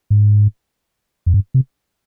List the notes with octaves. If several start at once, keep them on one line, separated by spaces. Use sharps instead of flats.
G#2
F2
G2
C3